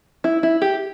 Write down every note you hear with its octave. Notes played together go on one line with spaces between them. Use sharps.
E4
E4
G4